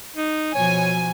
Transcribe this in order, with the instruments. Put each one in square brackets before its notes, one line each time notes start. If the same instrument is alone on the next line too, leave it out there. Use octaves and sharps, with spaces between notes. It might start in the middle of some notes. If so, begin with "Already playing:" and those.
[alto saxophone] D#4
[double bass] B2 F3 [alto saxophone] C#5 [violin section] G#5